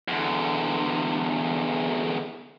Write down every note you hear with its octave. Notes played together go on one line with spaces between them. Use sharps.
E2 D3